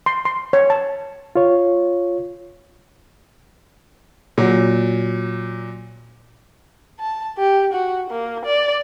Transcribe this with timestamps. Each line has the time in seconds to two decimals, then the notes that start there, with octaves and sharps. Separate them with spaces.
0.06 C6
0.25 C6
0.53 C#5
0.70 A5
1.36 F4 C#5
4.38 A#2 F#3
7.00 A5
7.38 G4
7.73 F#4
8.10 A#3
8.45 D5